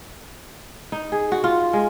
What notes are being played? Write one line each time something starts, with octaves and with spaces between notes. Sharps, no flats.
D#4
G#4
F#4
F4
G#3